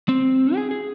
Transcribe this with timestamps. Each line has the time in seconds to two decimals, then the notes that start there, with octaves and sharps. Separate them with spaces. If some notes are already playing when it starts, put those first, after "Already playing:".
0.09 C4
0.55 G#4
0.71 G#4